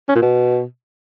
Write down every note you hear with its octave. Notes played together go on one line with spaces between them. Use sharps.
C#4
A#2
B2